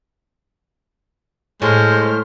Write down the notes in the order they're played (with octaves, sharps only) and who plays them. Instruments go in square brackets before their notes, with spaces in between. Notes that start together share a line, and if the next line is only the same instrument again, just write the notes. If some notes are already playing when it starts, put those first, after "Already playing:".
[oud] A2 [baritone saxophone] G#3 [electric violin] C5 F6